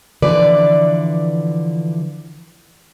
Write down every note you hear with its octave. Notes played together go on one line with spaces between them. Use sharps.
D3 E3 F3 B4 D5